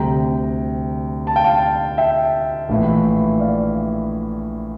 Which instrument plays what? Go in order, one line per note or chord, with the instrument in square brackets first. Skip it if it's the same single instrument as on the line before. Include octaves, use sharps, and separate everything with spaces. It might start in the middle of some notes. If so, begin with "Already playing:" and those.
Already playing: [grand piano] D2 C3 G3 G5 A#5
A5
G5
F5 A5
E5 G5
A#1 A2 E3
D5 F5